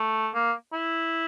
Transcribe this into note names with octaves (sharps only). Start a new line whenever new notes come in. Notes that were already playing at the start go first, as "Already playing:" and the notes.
Already playing: A3
A#3
E4